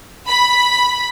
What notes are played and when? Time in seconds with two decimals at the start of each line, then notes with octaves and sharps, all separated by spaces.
0.27 B5